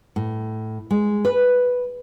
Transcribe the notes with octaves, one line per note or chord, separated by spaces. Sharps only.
A2
G#3
B4